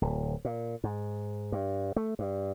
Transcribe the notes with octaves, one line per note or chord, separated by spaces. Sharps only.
D1
A#2
G#2
G2
A3
G2